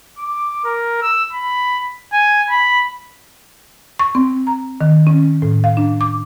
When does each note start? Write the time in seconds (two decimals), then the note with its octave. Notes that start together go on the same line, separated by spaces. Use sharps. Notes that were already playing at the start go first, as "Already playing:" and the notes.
0.19 D6
0.65 A#4
1.02 E6
1.33 B5
2.13 G#5
2.50 B5
3.99 C#6
4.15 C4
4.47 A#5
4.81 D#3
5.07 C#4
5.42 A2
5.64 F5
5.77 D4
6.01 D6